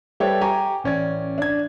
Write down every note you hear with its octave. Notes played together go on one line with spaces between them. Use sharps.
G3 G4 A4 B4 C#5 E5
G4 G#5 A#5 C#6
A1 C#4 D5 G#6
D4 G#6